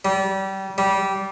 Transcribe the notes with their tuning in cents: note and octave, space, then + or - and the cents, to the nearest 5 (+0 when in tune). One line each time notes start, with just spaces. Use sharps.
G3 -25
G3 -15